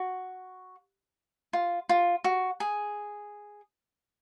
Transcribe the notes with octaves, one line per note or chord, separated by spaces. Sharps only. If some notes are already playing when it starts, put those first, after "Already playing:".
Already playing: F#4
F4
F4
F#4
G#4